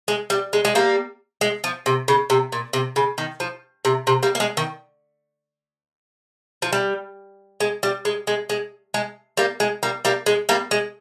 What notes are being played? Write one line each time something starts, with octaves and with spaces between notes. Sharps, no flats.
G#3
G3
G#3
G#3
G3 A#3
G#3
F3
C3
C#3
C3
A#2
C3
C#3
D#3
F3
C3
C3
G3 A#3
A#3
G#3
D#3
F3
G3
G#3
G3
G#3
G#3
G#3
G#3
G3 A#3
G#3
G3 A#3
G3 A#3
G#3
G3 A#3
G#3